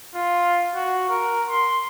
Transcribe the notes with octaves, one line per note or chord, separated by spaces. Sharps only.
F4
F#4
A#4
C6